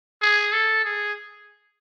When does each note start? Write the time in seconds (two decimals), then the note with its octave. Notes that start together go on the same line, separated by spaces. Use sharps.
0.22 G#4
0.53 A4
0.85 G#4